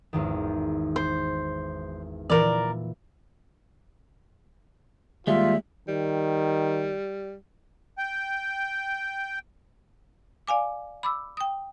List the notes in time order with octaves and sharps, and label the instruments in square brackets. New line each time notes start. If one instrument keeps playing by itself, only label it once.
[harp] G#1 E2 D#3
[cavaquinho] C5
[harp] A#2 E3 [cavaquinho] A#4 D5
[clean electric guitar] D#2 G3 G#3 [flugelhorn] F4 [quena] E5
[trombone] D#3 [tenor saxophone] G3
[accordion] G5
[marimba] D5 F5 G#5 D6
B5 D6 E6
G5 D#6